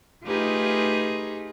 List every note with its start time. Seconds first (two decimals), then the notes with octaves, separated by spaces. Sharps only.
0.25 A3 D#4 F4 G4 G#4 B4